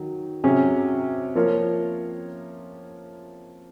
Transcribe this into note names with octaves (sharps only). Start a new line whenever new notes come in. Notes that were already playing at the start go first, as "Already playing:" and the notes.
Already playing: D#3 F#3
C3 F#3 C#4 G#4
F3 A#3 F4 A#4 C#5